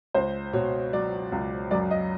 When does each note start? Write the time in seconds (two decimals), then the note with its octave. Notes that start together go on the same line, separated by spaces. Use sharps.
0.14 C#2 C5
0.53 B2 C#5
0.93 F#3 D5
1.32 C#2
1.71 F#2 D5
1.91 D#5